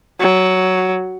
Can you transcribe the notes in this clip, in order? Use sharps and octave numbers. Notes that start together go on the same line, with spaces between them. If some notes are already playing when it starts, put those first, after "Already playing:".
F#3